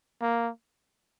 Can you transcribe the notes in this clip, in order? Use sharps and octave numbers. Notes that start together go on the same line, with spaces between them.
A#3